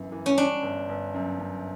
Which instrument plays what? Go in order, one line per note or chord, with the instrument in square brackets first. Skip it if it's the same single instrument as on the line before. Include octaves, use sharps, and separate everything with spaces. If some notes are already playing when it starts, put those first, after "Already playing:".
Already playing: [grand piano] G1 F#2 E3
E3
[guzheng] C#4
[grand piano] G3 [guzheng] D4
[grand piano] G1
G1
F#2
F#2